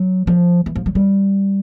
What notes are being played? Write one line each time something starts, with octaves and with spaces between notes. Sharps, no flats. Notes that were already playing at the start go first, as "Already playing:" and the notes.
Already playing: F#3
F3
E3
F3
F#3
G3